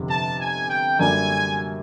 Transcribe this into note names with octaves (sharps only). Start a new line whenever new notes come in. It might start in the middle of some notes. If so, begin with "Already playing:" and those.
Already playing: G1 F2 C3
A5
G#5
G5
F#2 D3 G3 A#3 G#5